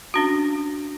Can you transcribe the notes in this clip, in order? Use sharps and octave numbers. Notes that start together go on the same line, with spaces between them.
C#4 D4 F#4